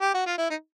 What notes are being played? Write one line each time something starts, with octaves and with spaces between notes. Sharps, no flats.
G4
F#4
F4
E4
D#4